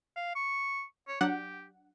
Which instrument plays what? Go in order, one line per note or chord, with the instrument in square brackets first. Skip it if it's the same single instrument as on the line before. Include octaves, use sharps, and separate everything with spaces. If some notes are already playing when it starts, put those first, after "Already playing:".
[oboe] F5
C#6
C#5
[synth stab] F#3 D4 F#5 [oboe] G4